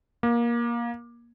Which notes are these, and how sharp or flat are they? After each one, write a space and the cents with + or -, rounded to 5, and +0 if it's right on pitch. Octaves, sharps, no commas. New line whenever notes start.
A#3 +20